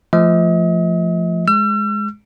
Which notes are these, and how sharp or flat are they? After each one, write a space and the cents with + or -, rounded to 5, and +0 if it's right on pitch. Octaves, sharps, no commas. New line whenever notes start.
F3 -15 A3 +0 D#5 +40
G#3 +0 E6 +45